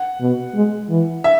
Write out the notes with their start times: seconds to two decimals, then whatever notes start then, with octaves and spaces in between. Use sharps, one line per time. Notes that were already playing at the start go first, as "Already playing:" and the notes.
Already playing: F#5
0.21 B2
0.55 G#3
0.89 E3
1.24 E5